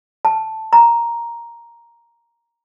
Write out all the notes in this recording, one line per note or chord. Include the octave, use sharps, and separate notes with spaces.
A5
A#5